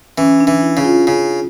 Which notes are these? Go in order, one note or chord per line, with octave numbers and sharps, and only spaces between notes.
E3 C#4
D4
E3
E4
C#3
F4
C#3